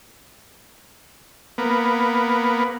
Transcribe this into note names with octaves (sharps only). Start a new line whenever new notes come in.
A#3 B3